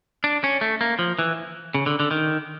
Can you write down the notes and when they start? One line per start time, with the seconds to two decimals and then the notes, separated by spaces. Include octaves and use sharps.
0.24 D4
0.44 C#4
0.61 A3
0.81 A#3
0.99 F3
1.19 E3
1.74 C#3
1.86 D3
2.00 D3
2.11 D#3